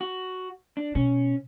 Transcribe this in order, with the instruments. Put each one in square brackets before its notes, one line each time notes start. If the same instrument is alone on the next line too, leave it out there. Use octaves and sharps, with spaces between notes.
[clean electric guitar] F#4
D4
[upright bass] B2 [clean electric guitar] C#4